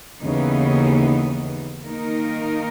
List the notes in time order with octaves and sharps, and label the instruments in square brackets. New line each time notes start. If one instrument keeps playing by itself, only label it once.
[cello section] D#2 C#3 E3 B3 D#4
D#3 A#3 D#4 A#4